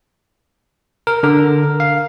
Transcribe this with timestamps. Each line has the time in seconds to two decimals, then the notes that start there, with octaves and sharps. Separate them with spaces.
1.07 A#4
1.23 D3 A#4
1.80 F5